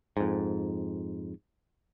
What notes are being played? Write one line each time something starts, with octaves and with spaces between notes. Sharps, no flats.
F2 G#2